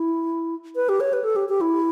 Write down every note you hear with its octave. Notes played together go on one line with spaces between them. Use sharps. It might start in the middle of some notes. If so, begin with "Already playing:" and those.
Already playing: E4
B4
G4
C#5
B4
A4
G4
G4
E4